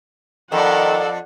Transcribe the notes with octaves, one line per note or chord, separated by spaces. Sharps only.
F2 D#3 A4 D5 F#5